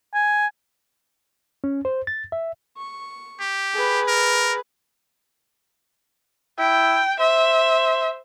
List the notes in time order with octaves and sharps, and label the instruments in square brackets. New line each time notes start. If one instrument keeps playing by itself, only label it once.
[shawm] G#5
[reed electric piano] C#4
C5
A6
E5
[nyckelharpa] C#6
[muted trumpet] G4
[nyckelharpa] G#4 B4
[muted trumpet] A#4
[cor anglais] E4 [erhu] G5
[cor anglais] C5 [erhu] E5